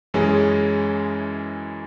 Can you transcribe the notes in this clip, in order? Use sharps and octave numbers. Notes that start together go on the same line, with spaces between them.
F#2 E3 G#3 C#4 G#4